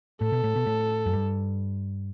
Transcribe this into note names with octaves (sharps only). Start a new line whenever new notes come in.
A2 A4
B2
A2
B2
A2
F#2
G2